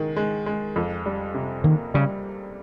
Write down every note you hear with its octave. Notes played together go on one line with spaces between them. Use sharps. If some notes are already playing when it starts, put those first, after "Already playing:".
Already playing: D#3 G#3
G#3
G#3
F2
G3
C3
D#3 A#3
C#3 G3